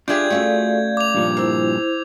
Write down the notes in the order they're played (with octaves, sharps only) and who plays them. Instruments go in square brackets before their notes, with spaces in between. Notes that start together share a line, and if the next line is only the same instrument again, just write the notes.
[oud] D4 E4 G4 [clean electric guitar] F4 G#4 [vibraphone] D5 [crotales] G6 G#6
[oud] A3 C#4 F#4 [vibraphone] D5 F5
[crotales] D6 F7
[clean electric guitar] G2 A#2 F3
[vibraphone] E4 C5 [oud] A#4